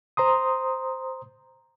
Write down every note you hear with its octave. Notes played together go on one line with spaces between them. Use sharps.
C5 A#5 C6 D#6